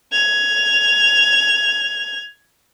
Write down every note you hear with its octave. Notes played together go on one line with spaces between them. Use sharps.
G#6 F7